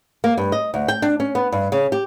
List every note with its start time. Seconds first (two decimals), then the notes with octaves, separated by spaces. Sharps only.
0.24 A#3
0.38 G2
0.52 D#5
0.74 D2
0.88 G5
1.02 D4
1.20 C#4
1.35 B3
1.52 G2
1.72 C#3
1.92 G4